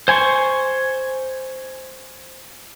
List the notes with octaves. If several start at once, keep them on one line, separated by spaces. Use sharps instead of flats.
C5 G#5 C6 C#6